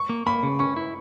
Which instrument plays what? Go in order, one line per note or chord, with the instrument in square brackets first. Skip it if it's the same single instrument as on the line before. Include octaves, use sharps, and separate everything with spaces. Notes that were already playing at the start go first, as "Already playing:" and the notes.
Already playing: [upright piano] C#6
[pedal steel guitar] A#3
[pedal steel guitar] A#3 [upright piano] B5
[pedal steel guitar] C#3
[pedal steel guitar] C#4 [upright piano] C#6
[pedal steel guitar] E4